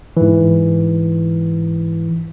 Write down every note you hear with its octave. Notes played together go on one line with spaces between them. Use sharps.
G#2 E3